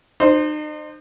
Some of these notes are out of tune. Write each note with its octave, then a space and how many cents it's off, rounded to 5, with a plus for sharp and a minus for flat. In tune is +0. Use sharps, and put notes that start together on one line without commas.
D#4 -40 C5 +0